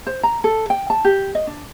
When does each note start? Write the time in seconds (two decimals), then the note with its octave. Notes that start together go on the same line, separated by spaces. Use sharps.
0.07 C5
0.23 A#5
0.44 A4
0.70 G5
0.90 A5
1.05 G4
1.35 D#5
1.47 D4